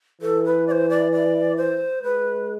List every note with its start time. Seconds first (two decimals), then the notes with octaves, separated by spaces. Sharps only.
0.21 E3 A4
0.45 B4
0.67 D5
0.71 C5
0.90 D5
1.12 D5
1.57 C5
2.03 G#3 B4